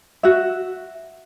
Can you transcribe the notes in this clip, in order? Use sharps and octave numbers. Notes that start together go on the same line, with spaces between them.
F#4 E5